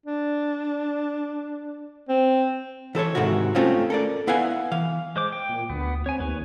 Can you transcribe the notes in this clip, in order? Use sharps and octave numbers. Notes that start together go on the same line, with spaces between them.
D4
C4
E3 A4 C5 C#5
G#2 C3 D#3 E4 F#4
A3 C4 C#4 F4
A4 A#4 D5
B3 E4 B4 F5 F#5 G#5
E3 F5
G#3 C5 D6
G5
A#2
D2 B3
C4 C#5 G#5
D#2 B4 C#5